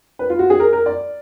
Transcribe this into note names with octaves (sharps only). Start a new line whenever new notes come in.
B4
F4
F#4
G#4
A#4
A#4
D5